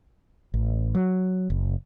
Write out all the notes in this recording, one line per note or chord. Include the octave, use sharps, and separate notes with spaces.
A1
F#3
F#1